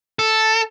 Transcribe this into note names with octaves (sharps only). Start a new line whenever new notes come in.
A4